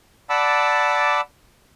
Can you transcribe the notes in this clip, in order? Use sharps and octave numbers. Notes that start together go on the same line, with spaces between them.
D5 F#5 A5 B5 D6 E6